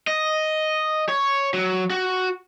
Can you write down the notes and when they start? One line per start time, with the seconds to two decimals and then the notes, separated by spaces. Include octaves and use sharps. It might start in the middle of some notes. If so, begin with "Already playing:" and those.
0.07 D#5
1.09 C#5
1.54 F#3
1.90 F#4